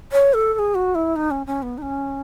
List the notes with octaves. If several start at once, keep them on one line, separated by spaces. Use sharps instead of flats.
C#5
A4
A4
G#4
F#4
E4
D#4
C#4
C#4
B3
D#4
C#4